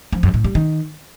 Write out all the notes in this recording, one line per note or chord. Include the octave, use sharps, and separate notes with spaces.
F3
F#2
A2
G3
D#3